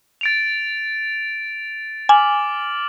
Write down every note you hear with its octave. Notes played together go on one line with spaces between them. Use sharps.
A6 D7 F7
G#5 D6 F6 F#7